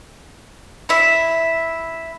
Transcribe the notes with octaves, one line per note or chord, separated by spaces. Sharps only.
E4 E5